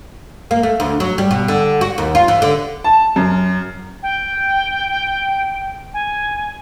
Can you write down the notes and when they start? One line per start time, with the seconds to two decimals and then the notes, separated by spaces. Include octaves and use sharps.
0.51 A#3
0.63 A3
0.80 D2
1.00 F#3
1.18 G3
1.31 B2
1.48 D3
1.81 F#4
1.98 D#2
2.15 F4
2.28 E3
2.42 D3
2.84 A5
3.16 F#2
4.03 G5
5.94 G#5